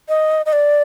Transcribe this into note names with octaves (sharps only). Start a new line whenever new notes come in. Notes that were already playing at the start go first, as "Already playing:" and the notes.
D#5
D#5
D5